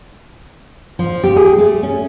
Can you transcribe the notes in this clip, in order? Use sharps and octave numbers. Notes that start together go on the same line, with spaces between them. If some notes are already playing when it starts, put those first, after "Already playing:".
F3
G4
G#4
A3
C#4